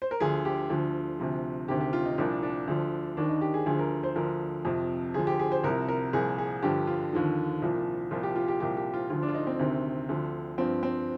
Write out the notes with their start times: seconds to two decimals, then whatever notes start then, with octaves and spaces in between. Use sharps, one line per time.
0.02 C5
0.11 A#4
0.20 D2 D3 F3 G#4
0.45 G4
0.70 D2 D3 F3
1.20 D2 C3 F3
1.68 D2 C3 D#3 G4
1.81 G4
1.93 F4
2.05 D#4
2.18 C2 A#2 F3 D4
2.43 D4
2.68 D2 D3 F3
3.17 D#2 D#3 D4
3.29 D#4
3.41 G4
3.54 G#4
3.66 D2 D3 F3 G#4
3.79 A#4
4.04 C5
4.16 D2 D3 F3 A#4
4.65 F2 C3 F3
5.14 D2 D3 F3 G#4
5.27 G4
5.39 G#4
5.52 C5
5.64 C2 C3 F3 A#4
5.89 A#4
6.13 C2 A#2 F3 G#4
6.38 G#4
6.63 G2 D3 F3 G4
6.87 F4
7.12 D#2 D3 F3
7.62 C2 A#2 F3
8.11 C2 A#2 F3 F4
8.23 G4
8.36 F4
8.48 G4
8.60 C2 A#2 F3 G4
8.77 G4
8.94 F4
9.10 D2 D3 F3 F4
9.23 D4
9.28 F4
9.34 D#4
9.47 C4
9.59 D2 C3 D#3
10.09 D2 D3 F3
10.58 G2 F3 C4
10.83 C4